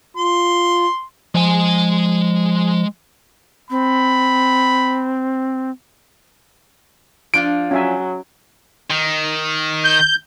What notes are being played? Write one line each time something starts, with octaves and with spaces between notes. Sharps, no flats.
F4 C6
F3 G#3 G#5
C4 B5
F3 D4 F4 D7
F#3 C#4 E5 G#5
D#3
G6